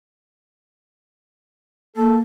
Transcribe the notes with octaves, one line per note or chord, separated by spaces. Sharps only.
A#3 A4